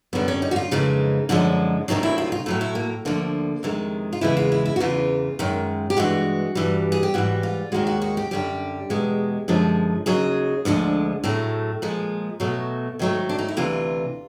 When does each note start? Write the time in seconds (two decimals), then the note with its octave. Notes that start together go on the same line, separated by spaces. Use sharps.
0.13 F#2 D3 G3 B3
0.28 C#4
0.42 D#4
0.51 F#4
0.56 F4
0.71 F2 C#3 E3 G#3 D#4
1.29 F#2 D3 F3 G#3
1.88 D2 C3 D#3 F#3 D#4
2.03 E4
2.18 F4
2.32 F4
2.46 A2 F#3 A3 E4
2.61 E4
2.75 A#3
3.05 D2 D3 F3 A#3
3.63 F2 C3 D#3 G#3
4.13 F4
4.21 E2 C#3 E3 G#3 E4
4.37 F4
4.52 E4
4.66 E4
4.76 F#4
4.80 E2 C#3 E3 F4
5.39 F#2 D#3 G#3
5.90 G4
5.97 G2 E3 G#3 F#4
6.55 G2 E3 G3
6.92 G#4
7.03 G4
7.14 G#2 E3 G3 F#4
7.43 F4
7.72 D#2 D#3 G#3 F#4
7.87 F#4
8.02 F#4
8.17 G4
8.31 F#2 D3 G3 G4
8.90 E2 B2 G#3
9.48 F#2 D3 F3 G#3
10.06 D#2 C#3 F#3 G#4
10.65 D2 D3 F3 G#3
11.24 A2 F#3 A3
11.82 A#2 F3 G#3
12.40 B2 F#3 A3
12.99 G#2 D#3 F#3 A3
13.29 D4
13.39 D#4
13.48 E4
13.57 D2 C3 E3 F4